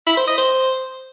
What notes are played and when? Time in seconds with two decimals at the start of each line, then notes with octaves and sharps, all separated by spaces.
0.07 E4
0.17 C5
0.28 D#5
0.38 C5